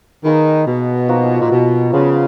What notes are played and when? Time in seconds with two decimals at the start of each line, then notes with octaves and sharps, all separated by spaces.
0.24 D#3 A#3 D#4 G#4 B4
0.66 B2
1.08 F3 A#3 D#4 F#4
1.41 A#2
1.51 B2
1.92 C#3 F3 B3 F4 B4